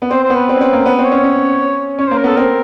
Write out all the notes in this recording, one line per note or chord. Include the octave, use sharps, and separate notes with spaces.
B3
C4 C5
C5
B3
B4
C4
C#4
C4
A#3
B3 B4
C4
C#5
C#4
C#4
C#4 C#5
C5
A#3
A#4
B3 A4
C4 A#4